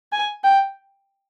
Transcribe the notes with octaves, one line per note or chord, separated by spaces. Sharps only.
G#5
G5